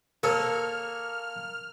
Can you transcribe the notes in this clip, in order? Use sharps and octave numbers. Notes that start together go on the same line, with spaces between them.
A#3 A4 A#4 C#5 F6